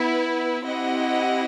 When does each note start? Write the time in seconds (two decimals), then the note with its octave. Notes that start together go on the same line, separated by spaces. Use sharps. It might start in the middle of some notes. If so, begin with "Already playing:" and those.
Already playing: B3 E4 B4
0.64 C4 E4 G4 D#5 F#5